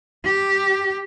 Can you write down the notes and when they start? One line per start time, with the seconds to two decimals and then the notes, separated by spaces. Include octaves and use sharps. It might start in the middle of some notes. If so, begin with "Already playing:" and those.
0.25 G4